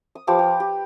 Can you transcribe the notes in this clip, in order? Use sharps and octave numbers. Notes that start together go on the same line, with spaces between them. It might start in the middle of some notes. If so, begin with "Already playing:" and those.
D#6
F3 G4 B4 D6
G4
G4